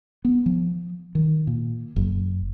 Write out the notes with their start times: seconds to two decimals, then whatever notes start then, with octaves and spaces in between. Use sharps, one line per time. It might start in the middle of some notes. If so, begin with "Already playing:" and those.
0.25 B3
0.46 F3
1.15 D#3
1.47 A#2
1.96 F#1